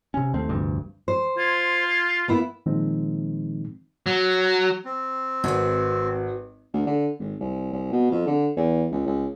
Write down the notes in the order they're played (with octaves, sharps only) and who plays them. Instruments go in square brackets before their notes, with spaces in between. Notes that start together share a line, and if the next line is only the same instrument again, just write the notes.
[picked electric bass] C3 C#4
D#2 A3 C4
F1 D2 G2
[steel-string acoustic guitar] C5
[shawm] F4 [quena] G#6
[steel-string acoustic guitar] A#3 B3 E4
[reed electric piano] A#2 D#3 F3 G#3 C4 D#4
[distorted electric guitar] F#3
[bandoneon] C4
[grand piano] G#1 [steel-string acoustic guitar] F#4 G#4 B4
[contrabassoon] D2
D3
G#1
C2
C2
B2
F2
D3
E2
C#2
C#2